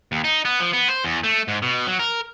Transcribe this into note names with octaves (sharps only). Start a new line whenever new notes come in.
D#2
D#4
B3
F3
B3
C5
E2
A3
G#2
B2
F#3
A#4